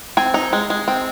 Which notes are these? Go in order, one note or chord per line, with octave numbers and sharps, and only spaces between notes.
C4 G#5
D#4
G#3
G#3
C4